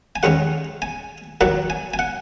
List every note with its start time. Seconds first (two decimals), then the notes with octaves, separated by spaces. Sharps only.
0.16 G#5
0.23 D#2 D#3 G#3 C#4 F#5
0.82 G#5
1.41 D#2 D#3 F#3 F#5
1.70 G#5
1.94 G#5
1.99 F#5